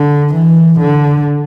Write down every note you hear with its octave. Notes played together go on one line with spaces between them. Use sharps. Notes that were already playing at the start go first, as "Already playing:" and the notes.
Already playing: D3
E3
D3